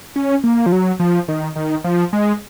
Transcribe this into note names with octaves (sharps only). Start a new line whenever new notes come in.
C#4
A#3
F3
F#3
F3
D#3
D#3
F3
G#3